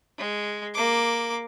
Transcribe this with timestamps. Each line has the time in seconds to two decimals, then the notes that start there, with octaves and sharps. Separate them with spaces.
0.18 G#3
0.74 A#3 D6